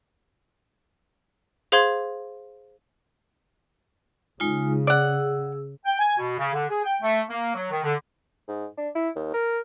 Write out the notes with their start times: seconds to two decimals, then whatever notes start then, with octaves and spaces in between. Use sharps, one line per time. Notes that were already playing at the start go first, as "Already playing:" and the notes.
1.72 G#4 C5 F5 C6 G#6
4.40 C#3 G#3 D#4 F4
4.87 G#4 D5 F#5 E6
5.85 G5
5.99 G#5
6.18 B2
6.38 C#3
6.53 D3
6.69 G#4
6.83 G5
7.02 A3
7.28 A#3
7.55 F#3
7.71 D#3
7.83 D3
8.48 G#2
8.77 D4
8.95 E4
9.16 D#2
9.34 A#4